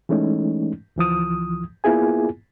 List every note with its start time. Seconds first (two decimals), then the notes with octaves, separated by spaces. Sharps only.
0.09 E3 G#3 A3 C#4 D#4
0.96 C#2 E3 F3 D#6
1.84 A#3 B3 E4 F4 G#4 G#5